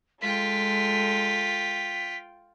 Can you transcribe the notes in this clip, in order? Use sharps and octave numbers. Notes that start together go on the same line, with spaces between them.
G#3 F4 A4 G5 B6